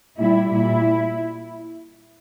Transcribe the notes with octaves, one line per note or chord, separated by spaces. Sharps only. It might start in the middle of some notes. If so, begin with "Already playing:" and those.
A#2 G3 E4
A#2 G3 E4